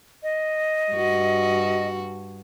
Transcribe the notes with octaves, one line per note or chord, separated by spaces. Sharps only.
D#5
G2 F#4